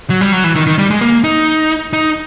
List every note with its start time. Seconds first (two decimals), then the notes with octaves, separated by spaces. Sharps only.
0.10 F#3
0.21 G3
0.33 F#3
0.44 E3
0.56 D#3
0.67 D#3
0.78 G3
0.90 G#3
1.01 A#3
1.24 D#4
1.93 D#4